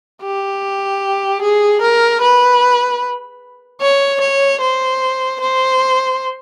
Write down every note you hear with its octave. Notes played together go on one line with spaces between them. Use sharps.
G4
G#4
A#4
B4
C#5
C#5
C5
C5